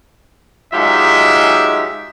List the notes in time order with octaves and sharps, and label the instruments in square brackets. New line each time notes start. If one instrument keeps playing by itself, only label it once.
[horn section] F#3 G#3 D#4 F4 G4 E5